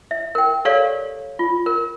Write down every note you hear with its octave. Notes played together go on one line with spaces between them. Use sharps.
E5
A#4 G5
G4 A4 A#4 C#5 D5 F5
F4
A#4